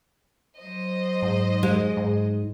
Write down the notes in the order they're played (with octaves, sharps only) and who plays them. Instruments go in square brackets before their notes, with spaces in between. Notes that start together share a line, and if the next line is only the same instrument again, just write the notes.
[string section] F#3 C5 D#5
[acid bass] G#2
[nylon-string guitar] G#3
[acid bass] G#2